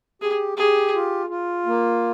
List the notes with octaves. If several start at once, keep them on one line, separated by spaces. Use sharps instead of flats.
G4 G#4
G4 G#4
F4
F4
A#3